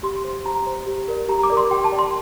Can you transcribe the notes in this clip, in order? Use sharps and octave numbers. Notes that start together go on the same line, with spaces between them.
G4 C6
C5
G4 A#5
C5
G4
A#4 D5
G4 A#5
D6
A#4 D5
C6
G4 G5
A5
D5
C6